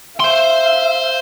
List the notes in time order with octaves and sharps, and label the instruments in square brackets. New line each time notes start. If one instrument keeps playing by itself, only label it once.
[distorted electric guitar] C5 C6 [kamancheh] E5 F5